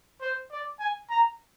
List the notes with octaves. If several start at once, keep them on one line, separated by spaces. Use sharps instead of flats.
C5
D5
G#5
A#5